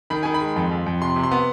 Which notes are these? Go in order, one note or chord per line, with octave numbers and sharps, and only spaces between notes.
D#3 B5
D#3 G#5
B5
G#3
F2
F2
F2
C3 C6
C3
C6
B3